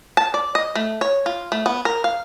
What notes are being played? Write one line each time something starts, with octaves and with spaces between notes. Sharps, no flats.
A5
D5
D#5
A3
C#5
F4
A3
B3
A#4
F5